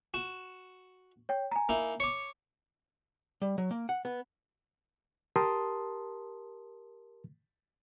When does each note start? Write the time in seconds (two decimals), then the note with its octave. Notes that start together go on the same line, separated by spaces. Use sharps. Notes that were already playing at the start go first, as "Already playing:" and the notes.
0.14 F#4 E7
1.29 C#5 G5
1.51 G#5 A#5
1.69 A#3 D#4 E4
2.00 C#5 D6 C#7
3.42 G3
3.58 F#3
3.71 A#3
3.89 F#5
4.05 B3
5.36 G4 A#4 A5 C6 D#6